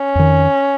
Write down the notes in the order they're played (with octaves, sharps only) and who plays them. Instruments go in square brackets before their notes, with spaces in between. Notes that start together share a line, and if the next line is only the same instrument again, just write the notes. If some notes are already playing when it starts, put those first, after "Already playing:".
Already playing: [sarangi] C#4
[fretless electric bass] F2 D#3